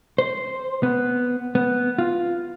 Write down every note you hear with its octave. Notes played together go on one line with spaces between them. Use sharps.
C5
B3
B3
F4